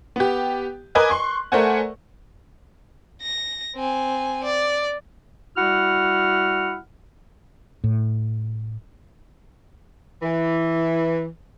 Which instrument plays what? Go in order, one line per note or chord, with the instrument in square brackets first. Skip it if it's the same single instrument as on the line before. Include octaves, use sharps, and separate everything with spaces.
[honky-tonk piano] B3 G4
A#4 B4 D#5 G#5 D6 F#6
C6 C#6
A3 A#4 C5 D5 F#5 G#5
[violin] A#6
C4 G#5
D5
[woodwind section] G3 E4 F#4 F#5 F6
[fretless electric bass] A2
[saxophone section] E3